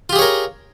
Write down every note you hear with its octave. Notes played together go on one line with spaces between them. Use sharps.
F4 G4 G#4 A#4 C#5